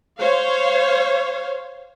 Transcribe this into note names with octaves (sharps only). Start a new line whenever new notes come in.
C5 C#5 F5